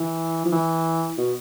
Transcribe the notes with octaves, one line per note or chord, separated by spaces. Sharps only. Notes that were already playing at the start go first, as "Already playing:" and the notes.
Already playing: E3
F3
E3
B2